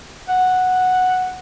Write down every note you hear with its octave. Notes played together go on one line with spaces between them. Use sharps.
F#5